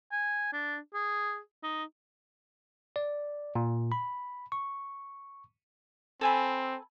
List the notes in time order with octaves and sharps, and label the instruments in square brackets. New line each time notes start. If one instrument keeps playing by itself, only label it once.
[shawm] G#5
D4
G#4
D#4
[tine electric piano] D5
A#2
B5
C#6
[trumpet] C4 [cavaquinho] A4 G#5 B5